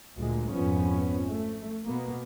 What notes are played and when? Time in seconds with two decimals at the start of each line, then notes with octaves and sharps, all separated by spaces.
0.17 D2 A#2 G#3
0.51 G#1 F2 F3 B3 C#4
1.28 A3
1.87 B2 A#3 B3